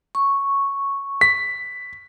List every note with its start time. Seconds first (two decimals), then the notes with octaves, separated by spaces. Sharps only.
0.15 C#6
1.21 B6